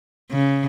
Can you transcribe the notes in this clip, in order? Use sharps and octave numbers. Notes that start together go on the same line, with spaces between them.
C#3